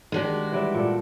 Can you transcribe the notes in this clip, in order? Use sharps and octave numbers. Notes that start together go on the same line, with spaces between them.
D#3 G#3 D4 F#4 G4
E3 G3 E5
A#2 A4